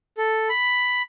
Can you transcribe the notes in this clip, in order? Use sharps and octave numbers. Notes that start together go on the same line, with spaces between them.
A4
B5